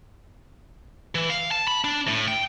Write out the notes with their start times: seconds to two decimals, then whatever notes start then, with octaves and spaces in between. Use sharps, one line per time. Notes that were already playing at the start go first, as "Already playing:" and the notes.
1.15 E3
1.30 F5
1.51 A5
1.68 B5
1.84 D4
2.08 A2
2.28 G5